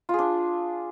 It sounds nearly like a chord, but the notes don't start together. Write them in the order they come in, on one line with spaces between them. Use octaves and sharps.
F4 G#4 D4